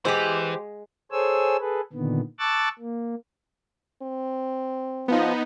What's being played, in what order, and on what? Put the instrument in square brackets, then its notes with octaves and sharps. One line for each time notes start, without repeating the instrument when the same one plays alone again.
[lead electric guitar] E3 [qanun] G#3 F#5 [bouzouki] G4 C5
[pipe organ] G#4 A4 C5 C#5 G#5 E6
G#4 A4 B4
A#2 D3 D#3 B3
A5 C#6 D6 E6 F#6 A6
A#3
[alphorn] C4
[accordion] F3 [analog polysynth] B3 D#4